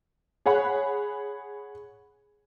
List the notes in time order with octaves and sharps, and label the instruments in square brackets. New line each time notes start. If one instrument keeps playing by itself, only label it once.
[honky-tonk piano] G#4 C#5 F#5 B5 F#6